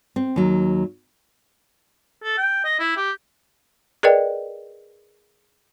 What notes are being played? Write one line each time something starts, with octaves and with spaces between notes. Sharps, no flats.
C4
D#2 F#3
A4
G5
D#5
E4
G4
G#4 A#4 B4 D5 D#5 G5